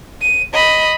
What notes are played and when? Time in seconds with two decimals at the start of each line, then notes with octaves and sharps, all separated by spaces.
0.21 D#7
0.53 D#5 B5